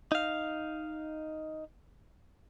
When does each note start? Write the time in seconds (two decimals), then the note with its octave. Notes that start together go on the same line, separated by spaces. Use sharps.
0.12 D#4 F5